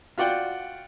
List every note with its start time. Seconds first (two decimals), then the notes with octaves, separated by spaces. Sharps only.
0.18 F4 F#4 D5 F#5 G5